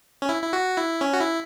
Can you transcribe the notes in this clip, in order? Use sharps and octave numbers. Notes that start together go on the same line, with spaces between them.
C#4
E4
E4
F#4
E4
C#4
F#4
E4